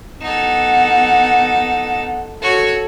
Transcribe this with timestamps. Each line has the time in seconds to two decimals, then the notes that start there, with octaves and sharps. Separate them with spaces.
0.22 B3 D#4 A4 F#5
2.42 F#4 A4 C#5